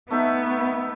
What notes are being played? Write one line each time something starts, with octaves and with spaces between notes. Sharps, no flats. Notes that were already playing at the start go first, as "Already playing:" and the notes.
A3 B3 D#4 E5